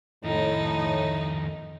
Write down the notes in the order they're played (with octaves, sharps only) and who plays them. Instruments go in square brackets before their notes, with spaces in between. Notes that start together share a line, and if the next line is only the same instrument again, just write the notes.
[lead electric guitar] F2 D#3 [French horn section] A2 [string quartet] D#4